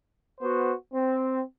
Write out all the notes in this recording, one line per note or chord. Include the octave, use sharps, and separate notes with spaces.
B3 F#4 C5
C4